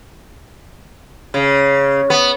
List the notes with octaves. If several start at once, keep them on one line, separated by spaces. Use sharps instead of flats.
C#3
B3